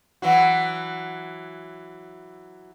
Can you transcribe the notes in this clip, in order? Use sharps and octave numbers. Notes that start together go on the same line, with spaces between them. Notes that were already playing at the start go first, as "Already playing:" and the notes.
E3 F#3 F#4